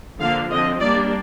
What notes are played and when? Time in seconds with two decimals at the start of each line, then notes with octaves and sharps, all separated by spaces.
0.20 D3 F3 A#3 F5
0.50 D3 F3 C4 D#5
0.80 G3 A#3 D4 D5